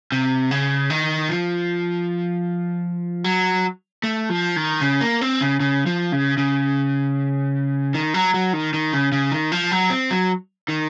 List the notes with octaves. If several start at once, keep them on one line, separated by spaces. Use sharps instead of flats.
C3
C#3
D#3
F3
F#3
A3
F3
D#3
C#3
A#3
C4
C#3
C#3
F3
C#3
C#3
D#3
F#3
F#3
D#3
D#3
C#3
C#3
D#3
F3
F#3
C4
F#3
D#3